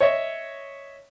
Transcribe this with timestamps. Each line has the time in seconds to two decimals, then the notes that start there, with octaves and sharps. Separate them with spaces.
0.01 C#5 D#5 E5 C#6